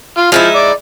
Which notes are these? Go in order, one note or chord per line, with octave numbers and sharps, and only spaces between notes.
F4
F3 G#3 D#4 E4
D5